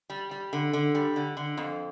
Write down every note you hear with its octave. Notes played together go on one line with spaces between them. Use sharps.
G3
G3
D3
D3
G3
D3
D3
F2